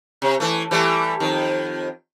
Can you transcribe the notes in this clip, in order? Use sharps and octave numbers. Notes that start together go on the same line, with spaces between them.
C3
E3 A3
E3 G3 A3
F2 D#3